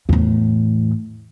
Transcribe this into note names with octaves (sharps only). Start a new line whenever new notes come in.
E2 A2